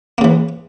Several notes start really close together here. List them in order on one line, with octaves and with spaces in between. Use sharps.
A#3 C#3 E3